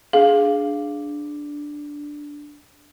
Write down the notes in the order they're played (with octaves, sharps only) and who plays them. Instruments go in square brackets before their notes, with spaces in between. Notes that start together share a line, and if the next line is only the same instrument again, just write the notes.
[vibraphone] D4 [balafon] G#4 [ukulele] F5